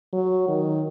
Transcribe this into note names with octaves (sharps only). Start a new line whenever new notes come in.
F#3
D#3